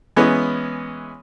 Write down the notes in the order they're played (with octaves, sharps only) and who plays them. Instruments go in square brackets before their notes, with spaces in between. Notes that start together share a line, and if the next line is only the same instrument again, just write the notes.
[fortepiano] E3 G#3 B3 C#4